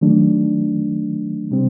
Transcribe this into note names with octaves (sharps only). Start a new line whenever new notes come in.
D#3 F#3 A3 D4
C3 G3 C4